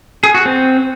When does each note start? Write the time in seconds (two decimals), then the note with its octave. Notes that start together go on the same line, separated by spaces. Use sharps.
0.24 G#4
0.35 F#4
0.46 C4